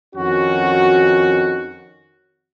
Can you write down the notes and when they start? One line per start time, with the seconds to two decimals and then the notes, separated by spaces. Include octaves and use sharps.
0.15 F2 D#3 C#4 F#4